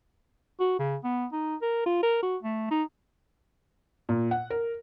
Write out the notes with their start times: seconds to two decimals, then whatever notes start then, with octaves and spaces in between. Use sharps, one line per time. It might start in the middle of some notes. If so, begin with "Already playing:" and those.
0.60 F#4
0.79 C#3
1.04 B3
1.32 D#4
1.62 A#4
1.86 F4
2.03 A#4
2.23 F#4
2.43 A3
2.71 D#4
4.09 A#2
4.31 F#5
4.50 A#4